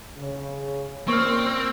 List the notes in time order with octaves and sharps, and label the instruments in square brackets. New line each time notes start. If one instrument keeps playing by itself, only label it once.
[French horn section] C#3
[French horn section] A#2 C#4 A#4 [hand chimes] A#3 [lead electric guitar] C4 [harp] C#6 F6